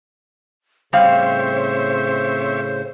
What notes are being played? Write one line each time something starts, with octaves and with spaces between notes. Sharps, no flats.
A2 C#3 G3 C4 C5 C#5 E5 F5